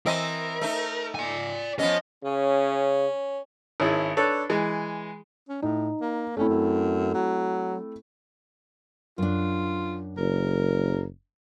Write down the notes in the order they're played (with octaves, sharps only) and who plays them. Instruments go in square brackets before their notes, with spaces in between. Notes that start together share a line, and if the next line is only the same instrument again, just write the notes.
[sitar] E3 C4 D#5 [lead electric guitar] A#4
[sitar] A3 D#4
[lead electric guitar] D5 G#5
[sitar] F3 B3 C#4 [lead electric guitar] D#5
[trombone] C#3 [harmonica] C#4
[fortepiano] G#1 C#4 E4 G#4
D4 A4 B4 C#5
E3 G#3
[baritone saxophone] C#4
[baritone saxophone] A2 [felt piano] D#4
[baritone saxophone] A#3
[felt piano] A3 C4 E4 [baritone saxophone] C#4
[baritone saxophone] F#2
F#3
[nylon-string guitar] F#2 D4 [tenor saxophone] F4
[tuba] F#1 [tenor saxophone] A#4